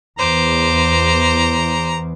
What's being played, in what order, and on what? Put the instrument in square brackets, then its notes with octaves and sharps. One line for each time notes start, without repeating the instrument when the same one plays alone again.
[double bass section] E2 [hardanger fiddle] C5 D6 [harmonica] A#5